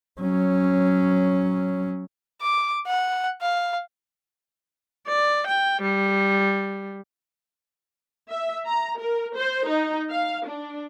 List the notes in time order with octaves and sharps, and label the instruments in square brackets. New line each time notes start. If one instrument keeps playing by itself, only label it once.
[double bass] F#3 C#4
[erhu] D6
F#5
F5
[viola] D5
G5
G3
[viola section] E5
A#5
A#4
C5
D#4
F5
D4